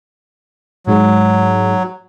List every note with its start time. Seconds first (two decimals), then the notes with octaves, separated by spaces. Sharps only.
0.87 G#2 F#3